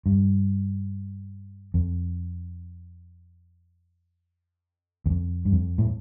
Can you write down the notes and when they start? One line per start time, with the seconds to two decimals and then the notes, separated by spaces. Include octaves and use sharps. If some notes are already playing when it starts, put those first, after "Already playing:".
0.06 G2
1.74 F2
5.06 E2
5.10 F2
5.45 G2
5.53 F2
5.78 A2